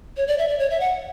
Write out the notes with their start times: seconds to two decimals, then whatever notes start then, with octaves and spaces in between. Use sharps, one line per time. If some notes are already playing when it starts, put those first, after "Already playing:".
0.17 C#5
0.28 D5
0.38 E5
0.48 D5
0.59 C#5
0.70 E5
0.80 F#5